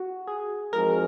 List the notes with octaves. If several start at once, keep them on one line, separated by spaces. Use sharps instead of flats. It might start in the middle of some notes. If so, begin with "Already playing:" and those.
Already playing: F#4
G#4
F2 F3 G#3 D#4 F#4 A#4